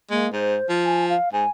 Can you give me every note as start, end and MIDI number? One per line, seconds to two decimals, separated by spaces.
0.11 0.27 56
0.11 0.30 58
0.33 0.58 44
0.33 0.67 72
0.69 1.15 53
0.85 1.05 80
1.10 1.29 77
1.33 1.45 44
1.33 1.50 80